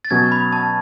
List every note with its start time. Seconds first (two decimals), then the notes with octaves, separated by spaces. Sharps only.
0.05 A6
0.10 B2 F#3 C#4 G#6
0.32 B5
0.53 A5